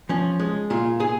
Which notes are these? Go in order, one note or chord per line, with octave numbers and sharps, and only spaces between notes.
F3 C#4
G#3
A#2 F4
A#2 G#4